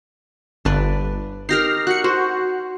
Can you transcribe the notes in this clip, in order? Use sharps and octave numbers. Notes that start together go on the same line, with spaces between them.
G1 D4 B4 D5
D#4 G4 A#4 F6 A#6 C7
F#4 F#6 C#7
F#4 C5